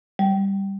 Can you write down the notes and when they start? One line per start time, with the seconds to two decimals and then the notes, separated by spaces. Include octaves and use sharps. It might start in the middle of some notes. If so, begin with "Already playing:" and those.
0.19 G3